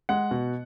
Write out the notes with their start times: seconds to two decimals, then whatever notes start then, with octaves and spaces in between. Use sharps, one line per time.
0.09 G#3 F#5
0.31 B2